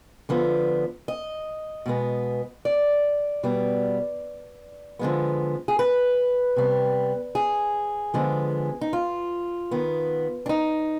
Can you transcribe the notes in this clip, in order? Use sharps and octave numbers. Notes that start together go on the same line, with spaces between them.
D3 F3 B3
D#5
B2 G#3 B3
D5
B2 G3 B3
D3 F3 G#3 B3
G#4
B4
C3 G3 B3
G#4
D3 F3 G#3 B3
D#4
F4
D#3 B3
D4
D#4